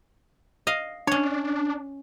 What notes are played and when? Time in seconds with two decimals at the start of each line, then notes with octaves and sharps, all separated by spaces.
0.67 D#5 F5
1.07 C#4 D4 C#5